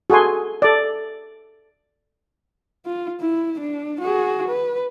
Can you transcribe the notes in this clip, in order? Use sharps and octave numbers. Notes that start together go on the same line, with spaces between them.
F#4 G#4 A4 G#5 C6
A4 D5
F4
E4
D4
F#4 G#4
B4